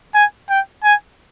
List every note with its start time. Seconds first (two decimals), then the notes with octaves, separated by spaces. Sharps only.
0.15 G#5
0.49 G5
0.84 G#5